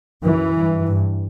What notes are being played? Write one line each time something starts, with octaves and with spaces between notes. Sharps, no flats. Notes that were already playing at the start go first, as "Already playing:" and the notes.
F#2 E3
G2
G2